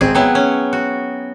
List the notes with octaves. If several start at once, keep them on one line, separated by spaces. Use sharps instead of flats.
G#1 C4 G#4
F#3 B3 E4 G5
C#4
F#4